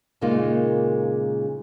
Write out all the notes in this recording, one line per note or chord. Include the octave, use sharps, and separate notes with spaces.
A#2 C#3 G#3 A#3 D#4 F4